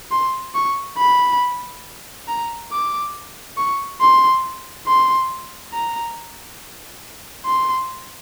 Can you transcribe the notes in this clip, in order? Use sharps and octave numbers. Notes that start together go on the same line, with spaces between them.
C6
C#6
B5
A#5
D6
C#6
C6
C6
A#5
C6